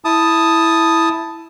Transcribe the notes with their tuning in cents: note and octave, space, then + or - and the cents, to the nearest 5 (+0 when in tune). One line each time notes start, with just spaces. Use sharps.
E4 +0 A5 +0 D#6 +0